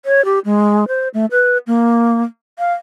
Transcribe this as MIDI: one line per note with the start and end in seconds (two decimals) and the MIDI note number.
0.05 0.24 73
0.25 0.39 67
0.45 0.85 56
0.88 1.08 72
1.14 1.26 57
1.31 1.58 71
1.67 2.23 58
2.59 2.74 77